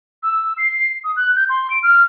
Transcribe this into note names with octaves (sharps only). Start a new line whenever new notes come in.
E6
C7
D#6
F#6
G6
C6
D7
F6